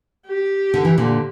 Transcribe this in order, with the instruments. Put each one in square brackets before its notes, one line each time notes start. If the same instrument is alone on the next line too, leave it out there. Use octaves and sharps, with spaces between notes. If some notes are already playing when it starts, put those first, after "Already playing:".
[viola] G4
[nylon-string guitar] D3
E3
A#2 D3